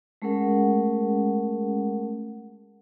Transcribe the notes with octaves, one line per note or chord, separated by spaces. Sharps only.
G#3 A3 C#4 G#4 A#4 F#5